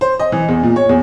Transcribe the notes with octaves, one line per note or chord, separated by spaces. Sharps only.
C5
D#5
E3
E2
A#2
C#5
E2